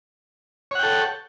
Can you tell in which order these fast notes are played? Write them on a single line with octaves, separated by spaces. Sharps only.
C#5 F#5 G5 A4